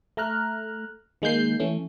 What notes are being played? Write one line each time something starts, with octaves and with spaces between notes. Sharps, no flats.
A3 A#5 F6 F#6
D#3 G#3 A#3 G6 C7
E3 A3 C#4